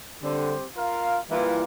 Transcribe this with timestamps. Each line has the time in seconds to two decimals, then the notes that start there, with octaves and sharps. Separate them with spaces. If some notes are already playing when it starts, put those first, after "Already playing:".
0.22 D3 G3 C4 G4 C5
0.76 F4 A#4 F5
1.30 E3 G3 A#3 F4